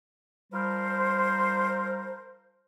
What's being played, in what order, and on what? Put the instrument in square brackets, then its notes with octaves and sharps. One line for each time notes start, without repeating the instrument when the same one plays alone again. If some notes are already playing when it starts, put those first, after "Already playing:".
[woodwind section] F3 G3 A#4 C5